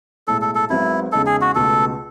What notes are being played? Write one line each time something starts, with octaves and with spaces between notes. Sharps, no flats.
B1 A2 G#3 A4
A4
A4
G#1 G#2 F#3 B3 E4
E2 C#3 G#3 D#4 A4
G#4
F#4
C#2 B2 A3 A4